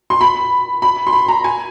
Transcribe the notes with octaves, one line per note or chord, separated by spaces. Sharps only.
C6
B5
B5
C6
B5
A#5
G#5